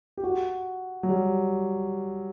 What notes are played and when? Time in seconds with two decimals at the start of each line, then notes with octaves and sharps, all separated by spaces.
0.17 G4
0.24 F#4
1.03 F#3
1.10 G3